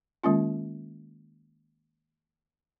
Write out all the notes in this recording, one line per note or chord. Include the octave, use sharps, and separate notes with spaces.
D#3 G#3 A#3 C#4 F4